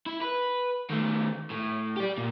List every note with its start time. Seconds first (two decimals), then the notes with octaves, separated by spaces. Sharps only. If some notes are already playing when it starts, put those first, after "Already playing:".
0.06 E4
0.21 B4
0.90 D#3 A3
1.50 A2
1.97 G4 D5
2.18 A#2